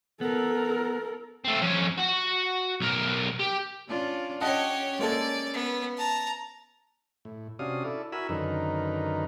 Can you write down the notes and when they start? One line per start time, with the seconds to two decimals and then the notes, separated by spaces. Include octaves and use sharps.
0.21 B3 A4 A#4
1.45 A3 C4
1.62 F2 C#4
1.98 F#4 F#5
2.80 B1 A#4
3.40 G4
3.88 C#4 D4 F4
4.41 C#4 G4 C#5 D#5 F#5 A5
4.99 G#3 A#3 A4 D5
5.54 B3
5.97 A5 A#5
7.25 A2
7.59 C3 C#4 D4 F#4 F5 D#6
7.85 E4 A4 D5
8.12 E4 F#4 A#4 G#5 B5 E6
8.29 F#2 D3 D#3 D#4 A#4 B4